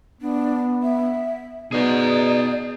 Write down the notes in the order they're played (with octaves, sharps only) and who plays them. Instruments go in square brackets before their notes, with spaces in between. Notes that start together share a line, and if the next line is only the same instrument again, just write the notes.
[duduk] B3 [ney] D4
[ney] E5
[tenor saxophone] B2 [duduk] D#4 [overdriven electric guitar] G#4 F#5 [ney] D5